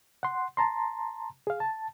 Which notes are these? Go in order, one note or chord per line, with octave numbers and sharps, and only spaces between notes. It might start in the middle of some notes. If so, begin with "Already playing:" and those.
F#5 C6
A5 A#5 C6
G#4 F5
A5